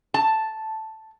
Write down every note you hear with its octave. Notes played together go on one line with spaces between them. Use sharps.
A5